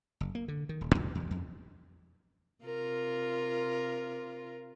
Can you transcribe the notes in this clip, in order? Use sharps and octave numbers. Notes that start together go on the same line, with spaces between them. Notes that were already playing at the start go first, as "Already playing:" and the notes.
F#1
A#3
D3
D#3
D#1
E2
E2
F2
C3 F4 A#4